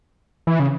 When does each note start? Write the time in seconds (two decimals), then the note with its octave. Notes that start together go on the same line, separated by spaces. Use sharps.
0.47 E3
0.60 C#3